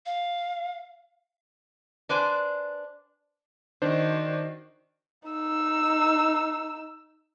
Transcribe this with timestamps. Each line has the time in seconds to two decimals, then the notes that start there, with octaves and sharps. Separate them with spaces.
0.06 F5
2.09 D4 B4 C5 G#5
3.82 D#3 D4 F#4 C5
5.29 D#4 E6